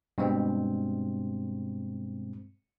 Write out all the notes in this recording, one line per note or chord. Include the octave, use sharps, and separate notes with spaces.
G2 B2 G#3 C4